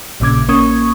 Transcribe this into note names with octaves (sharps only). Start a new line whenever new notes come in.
A#1 A#2 C#3 D6 G#6
A1 A#3 C#4 C#6 D#6 G#6